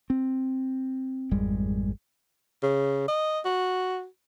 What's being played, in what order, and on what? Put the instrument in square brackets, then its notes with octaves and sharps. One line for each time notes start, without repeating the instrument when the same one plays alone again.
[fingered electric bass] C4
G#1 F2 G3 G#3
[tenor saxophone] C#3
D#5
F#4